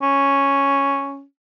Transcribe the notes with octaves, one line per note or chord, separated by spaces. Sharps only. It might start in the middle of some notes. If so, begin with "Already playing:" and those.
C#4